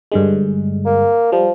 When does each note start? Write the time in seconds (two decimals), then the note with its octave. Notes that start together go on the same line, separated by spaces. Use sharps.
0.12 G2 D3 G#3
0.86 A#3
1.32 F3 G3